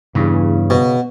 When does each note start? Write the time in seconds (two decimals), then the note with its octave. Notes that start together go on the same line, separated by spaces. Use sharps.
0.15 E2 G2 C#3
0.70 B2